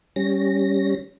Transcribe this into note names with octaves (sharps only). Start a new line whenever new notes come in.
G3 C#4 A#6